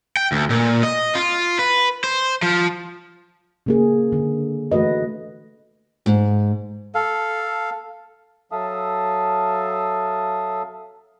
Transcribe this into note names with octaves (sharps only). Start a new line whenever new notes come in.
G5
D2
A#2
D#5
F4
B4
C5
F3
C#3 A#3 G#4
D3
E3 A3 F#4 B4 D#5
G#2
A4 F5
F#3 A4 E5 F5 A5 D#6